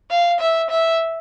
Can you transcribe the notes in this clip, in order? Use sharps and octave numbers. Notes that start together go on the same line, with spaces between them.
F5
E5
E5